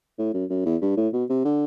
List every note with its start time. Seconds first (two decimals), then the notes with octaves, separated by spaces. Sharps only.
0.19 A2
0.34 F#2
0.50 F#2
0.65 E2
0.81 G2
0.97 A2
1.13 B2
1.29 C3
1.45 D3